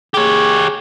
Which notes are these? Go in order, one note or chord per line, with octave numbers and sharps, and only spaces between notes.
G4 G#4 C#5